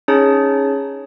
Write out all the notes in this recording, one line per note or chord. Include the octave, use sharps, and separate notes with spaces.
C#4 D#4 G#4 C#5 A5